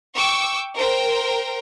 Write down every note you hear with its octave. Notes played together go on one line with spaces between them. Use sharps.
G5 C#6 D6 E6
A#4 C5 G5